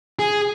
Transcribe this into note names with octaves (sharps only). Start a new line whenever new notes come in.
G#4